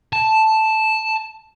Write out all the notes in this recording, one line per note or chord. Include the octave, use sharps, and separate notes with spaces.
A5